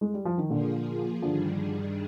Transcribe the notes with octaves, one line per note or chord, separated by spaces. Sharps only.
G#3
G3
F3
D#3
A#2 D3 F3 A#3 F4 G#4
G2 D3 D#3 F3 G3 D4 G#4